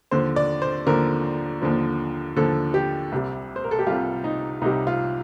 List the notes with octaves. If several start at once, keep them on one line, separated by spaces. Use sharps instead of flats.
D#2 D3 F3 C5
D5
C5
D#2 D3 F3 A#4
D#2 D3 F3
D#2 D3 F3 A4
G4
C2 C3 G3
C5
A#4
A4
G4
C2 C3 G3 F4
D#4
C2 C3 G3 D#4
F4